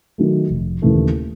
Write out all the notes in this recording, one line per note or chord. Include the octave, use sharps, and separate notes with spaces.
D#3 F#3 A3
F1
D#2 C#3 E3 A3